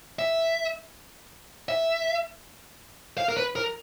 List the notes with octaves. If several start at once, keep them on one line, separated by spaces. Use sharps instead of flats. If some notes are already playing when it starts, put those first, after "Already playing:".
E5
E5
F5
A#4
B4
A#4